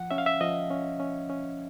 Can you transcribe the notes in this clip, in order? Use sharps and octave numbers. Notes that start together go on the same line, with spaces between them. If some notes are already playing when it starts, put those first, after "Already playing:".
Already playing: F3 F#5
C#4 E5
F5
E5
F3 D#5
C#4
C#4
C#4